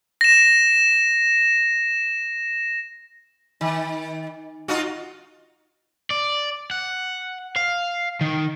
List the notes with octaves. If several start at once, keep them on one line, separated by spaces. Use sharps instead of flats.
A#6 E7
D#3
D#4 F4 F#4
D5
F#5
F5
D#3